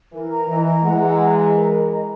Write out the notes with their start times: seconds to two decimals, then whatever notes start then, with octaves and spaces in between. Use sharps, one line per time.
0.12 E3 A#4
0.30 A#5
0.48 E3 D#5
0.65 A#5
0.83 E3 G#3 F#5
1.01 A#5
1.20 A#5
1.37 A#5
1.54 A#4
1.72 D#5
1.90 A#5